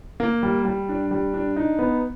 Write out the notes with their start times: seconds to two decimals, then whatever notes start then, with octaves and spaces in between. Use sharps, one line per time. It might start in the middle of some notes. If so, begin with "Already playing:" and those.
0.20 A#3
0.43 G3
0.65 G3
0.89 D4
1.11 G3
1.34 D4
1.56 D#4
1.79 B3